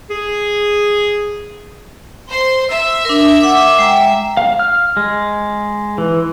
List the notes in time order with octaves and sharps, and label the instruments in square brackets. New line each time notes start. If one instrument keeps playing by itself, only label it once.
[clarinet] G#4
[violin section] C5 C6
[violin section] E5 [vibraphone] E6
[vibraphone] D4 A#4
F#5 D6
G#3 G5 A#5
[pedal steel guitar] F5
F6
G#3
E3